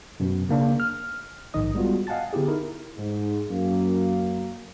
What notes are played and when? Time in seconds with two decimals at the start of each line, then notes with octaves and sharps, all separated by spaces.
0.20 F#2 B2
0.49 C#3 A#3 D4
0.80 F6
1.54 A#1 G#2 D#3 D#4 D#5 D#6
1.75 G3 G#3 B3 F4 F#4
2.07 D#5 F5 F#5 G#5 A5 A6
2.33 D3 B3 E4 G4 G#4
2.47 D#4 E4 A#4
2.97 G#2
3.50 F#2 A#3